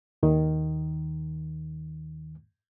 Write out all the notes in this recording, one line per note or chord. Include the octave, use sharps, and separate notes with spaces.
D#2 D#3